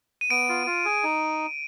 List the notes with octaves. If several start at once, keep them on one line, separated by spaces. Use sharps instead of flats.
D#7
B3 D7
F4
F4
G#4
D#4